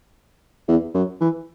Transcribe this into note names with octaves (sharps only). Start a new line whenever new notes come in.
E2
F#2
E3